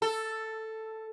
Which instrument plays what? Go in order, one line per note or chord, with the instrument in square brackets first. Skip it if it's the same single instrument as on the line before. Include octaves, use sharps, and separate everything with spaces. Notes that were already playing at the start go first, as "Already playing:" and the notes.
[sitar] A4